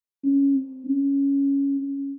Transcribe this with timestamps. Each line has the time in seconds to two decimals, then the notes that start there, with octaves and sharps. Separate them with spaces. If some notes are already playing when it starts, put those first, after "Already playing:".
0.24 C#4
0.55 C4
0.86 C#4
1.79 C#4